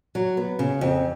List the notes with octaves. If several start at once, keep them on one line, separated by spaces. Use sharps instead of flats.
F#3
B3
C#3
F2